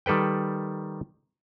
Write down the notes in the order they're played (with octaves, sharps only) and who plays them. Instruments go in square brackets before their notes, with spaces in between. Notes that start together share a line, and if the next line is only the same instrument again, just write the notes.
[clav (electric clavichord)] D#3 G3 A4 B4 G5